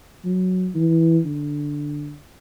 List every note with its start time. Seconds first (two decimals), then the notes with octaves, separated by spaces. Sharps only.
0.25 F#3
0.75 E3
1.25 D3